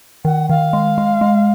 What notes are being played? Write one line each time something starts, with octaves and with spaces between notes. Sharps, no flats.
D#3 F#5
D#3 F5
G#3
G#3
G#3